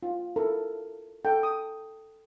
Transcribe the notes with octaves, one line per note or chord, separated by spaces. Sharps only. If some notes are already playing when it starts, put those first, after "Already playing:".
F4
E4 A4 A#4
A4 F#5 G5
D#6